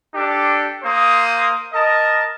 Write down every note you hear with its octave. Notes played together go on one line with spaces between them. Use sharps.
D4 G4 A4
A#3 C5 D#6
A#4 D#5 A5